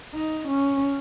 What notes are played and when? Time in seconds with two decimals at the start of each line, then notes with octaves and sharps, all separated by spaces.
0.15 D#4
0.48 C#4